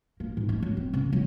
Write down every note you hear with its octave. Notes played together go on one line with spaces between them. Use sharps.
A#3
G#2
A3
F#3
C4
C#3
F#3